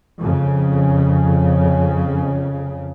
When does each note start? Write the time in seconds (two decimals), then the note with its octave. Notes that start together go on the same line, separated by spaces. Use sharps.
0.20 F2 C#3